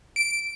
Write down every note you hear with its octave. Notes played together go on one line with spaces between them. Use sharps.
D7